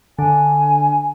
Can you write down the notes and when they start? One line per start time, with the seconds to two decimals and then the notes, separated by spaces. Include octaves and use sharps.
0.19 D3 G#5